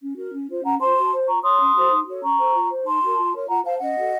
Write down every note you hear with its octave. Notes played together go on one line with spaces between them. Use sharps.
C#4
F#4 A#4
C#4
F4 C5
C#4 F#5 A#5
F4 C5 A5 C6
F#4
C5
F4 A#5 C#6
A4 C#5 C6 D#6
C#4
F#4 A4 C5
D#4
F#4 A4 C#5
C#4 A#5 C#6
A4 C5
F4
C5
D#4 A5 C6
F#4 A#4
F4
A#4 C#5
F4 F#5 A#5
C5 F5 A5
C#4 D#5 F#5
F#4 A4